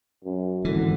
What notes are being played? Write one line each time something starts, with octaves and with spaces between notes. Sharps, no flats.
F#2
G#1 D3 E3